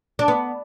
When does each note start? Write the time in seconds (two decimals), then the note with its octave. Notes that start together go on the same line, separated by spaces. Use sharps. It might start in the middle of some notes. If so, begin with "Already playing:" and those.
0.19 D4
0.28 B3